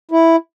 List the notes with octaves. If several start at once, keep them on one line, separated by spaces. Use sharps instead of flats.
E4